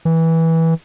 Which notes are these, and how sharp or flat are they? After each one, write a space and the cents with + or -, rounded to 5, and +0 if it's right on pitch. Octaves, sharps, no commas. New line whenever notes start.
E3 -15